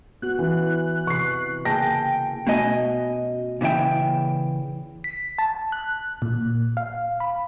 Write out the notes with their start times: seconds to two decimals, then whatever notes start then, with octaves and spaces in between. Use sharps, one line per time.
0.22 B3 F#4 F#6
0.39 E3 C#4
1.07 C3 E3 C#6 C7
1.65 C#3 A#3 G#4 G5 A5 A#6
2.47 B2 A3 C#4 D#5 G#5
3.61 A#2 C#3 E3 E5 G5
5.04 B6
5.38 A5
5.72 F#6
6.22 A#2
6.77 F5
7.20 B5